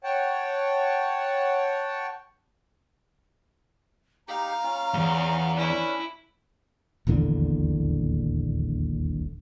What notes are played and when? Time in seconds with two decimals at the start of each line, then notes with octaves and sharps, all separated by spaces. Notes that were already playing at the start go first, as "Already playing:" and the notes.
0.04 C#5 F#5 G5 A5
4.28 D#4 G4 F5 A#5
4.63 C#4 F4
4.94 E2 G2
5.57 C#4 D4 E4 B4
7.07 D#1 A#1 E2 D3